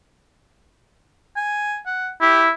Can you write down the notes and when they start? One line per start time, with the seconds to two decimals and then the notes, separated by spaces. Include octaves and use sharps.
1.36 G#5
1.86 F#5
2.21 E4 G4